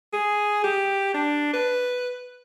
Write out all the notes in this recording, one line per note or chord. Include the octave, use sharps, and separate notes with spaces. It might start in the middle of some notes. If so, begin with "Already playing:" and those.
G#4
G4
D4
B4